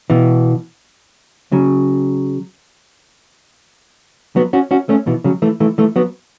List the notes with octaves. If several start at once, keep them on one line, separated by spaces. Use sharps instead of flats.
B2 E3
C#3 F#3
F#3 B3
C#4 F#4
C#4 F#4
A3 C#4
B2 E3
C#3 F#3
E3 A3
E3 A3
E3 A3
F#3 B3